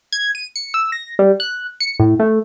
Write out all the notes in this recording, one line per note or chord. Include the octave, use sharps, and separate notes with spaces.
G#6
D#7
C#7
E6
A#6
G3
F#6
C#7
A2
A3